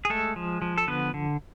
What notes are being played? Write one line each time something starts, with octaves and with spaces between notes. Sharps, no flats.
G#4
G#3 A3 A4
F3
F3
A4
D3 B3 B4
D3